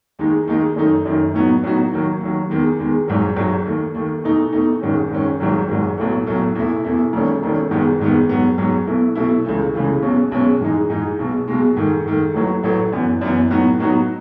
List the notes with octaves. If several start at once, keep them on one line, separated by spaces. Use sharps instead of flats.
D#2 D#3 G#3 D#4
D#2 D#3 G#3 D#4
F#2 D#3 A3 D#4
F#2 D#3 A3 D#4
A2 F#3 B3 D#4 F#4
A2 F#3 B3 D#4 F#4
D#2 D#3 F#3
D#2 D#3 F#3
E2 D#3 G#3
E2 D#3 G#3
G#1 G#2 F#3
G#1 G#2 F#3
D#2 D#3 A3
D#2 D#3 A3
E2 B2 A3 D#4
E2 B2 A3 D#4
G#1 G#2 D#3 G#3 C#4
G#1 G#2 D#3 G#3 C#4
G#1 G#2 D#3 F#3
G#1 G#2 D#3 F#3
B1 A2 F#3 A3
B1 A2 F#3 A3
E2 B2 A3 E4
E2 B2 A3 E4
E1 D#2 D#3 A3 C#4
E1 D#2 D#3 A3 C#4
G#1 G#2 D#3 G#3 B3
G#1 G#2 D#3 G#3 B3
G#2 F#3 B3
G#2 F#3 B3
B1 B2 A3 E4
B1 B2 A3 E4
C#2 C#3 E3 A3
C#2 C#3 E3 A3
B1 B2 G#3 C#4
B1 B2 G#3 C#4
G#2 E3 G#3 D#4
G#2 E3 G#3 D#4
B1 B2 G#3
B1 B2 G#3
G#2 D#3 A3
G#2 D#3 A3
A1 A2 F#3 A3
A1 A2 F#3 A3
F#2 E3 B3
F#2 E3 B3
A2 F#3 B3 D#4 F#4
A2 F#3 B3 D#4 F#4